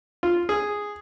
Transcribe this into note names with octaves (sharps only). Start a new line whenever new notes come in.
F4
G#4